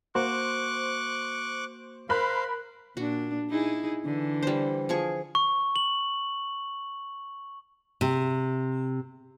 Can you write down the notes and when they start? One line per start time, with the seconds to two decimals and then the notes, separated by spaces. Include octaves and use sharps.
0.15 A#3 F#4 C5 C#6 D6 F#6
2.09 A#4 C5 F5 B5 F#6
2.97 A#2 D4 F#4
3.49 D#4 E4 G#4
4.05 D3 E3
4.43 G3 C5
4.89 F3 G#4 C#6
5.35 C#6
5.76 F#7
8.01 C3